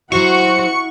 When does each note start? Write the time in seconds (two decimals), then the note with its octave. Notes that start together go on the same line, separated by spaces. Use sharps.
0.12 F#3 E4 F#4 C5 F#5 C#6